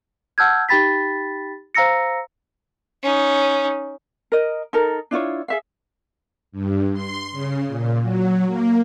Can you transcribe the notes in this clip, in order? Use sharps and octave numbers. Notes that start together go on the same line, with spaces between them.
F#5 A5 E6 F6 G6 G#6
D#4 G4 G5 B5 A6 B6
C5 F5 A#5 E6 A#6 C#7
C#4 D#4
A#4 D#5
D#4 A4 A#4
D4 E4 F4 C#5
G#4 E5 F5
G2
C6
C#3
A#2
F#3
A#3